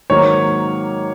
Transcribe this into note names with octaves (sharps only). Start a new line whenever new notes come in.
G#2 D#3 F#3 A#3 C#5